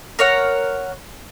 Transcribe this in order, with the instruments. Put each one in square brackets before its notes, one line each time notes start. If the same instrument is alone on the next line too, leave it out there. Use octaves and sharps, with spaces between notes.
[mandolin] A#4 C#5 F#5